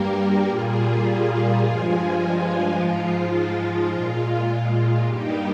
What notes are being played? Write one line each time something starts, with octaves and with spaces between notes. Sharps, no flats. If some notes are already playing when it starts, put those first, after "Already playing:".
Already playing: G2 G3 A#3 G4 A#4
A#2 G3 A#3 F4 G#4
F4 G#4
G2 F3 G#3
G#2 F3 G#3 F4
A#2 G#3
F4
G2 G3 A#3 D#4 G4